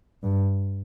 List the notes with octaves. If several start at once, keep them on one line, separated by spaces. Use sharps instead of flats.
G2